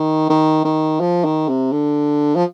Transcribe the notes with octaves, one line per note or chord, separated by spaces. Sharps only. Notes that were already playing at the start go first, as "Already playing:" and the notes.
Already playing: D#3
D#3
D#3
F3
D#3
C3
D3
F3